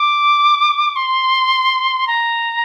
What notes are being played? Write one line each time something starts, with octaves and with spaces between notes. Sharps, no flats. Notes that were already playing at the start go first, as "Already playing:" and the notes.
Already playing: D6
C6
A#5